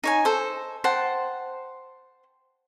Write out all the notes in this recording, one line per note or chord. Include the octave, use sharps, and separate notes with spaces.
D#4 C#5 G#5
A4 C5
C5 F#5 G5 A5